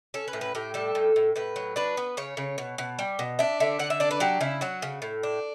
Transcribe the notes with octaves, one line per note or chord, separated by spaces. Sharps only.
C#4 A4
B4
A2
B4
A2 G4
G3 A4
A2
A2
A2 B4
F#3
D4 B4
B3
C#3 C#5
C#3
B2
B2
G3
B2
D4 E5
D3 E5
D3 F#5
E5
D4 D5
B4
F#3 G4
C#3 E4
F#3 F#4
C#3
A2
D4